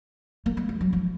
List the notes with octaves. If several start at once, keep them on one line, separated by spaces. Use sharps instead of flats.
A#3
G#3
G#3
F#3
F3